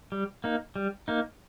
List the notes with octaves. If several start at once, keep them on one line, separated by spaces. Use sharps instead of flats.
G3
A#3 D#4
G3
A#3 D#4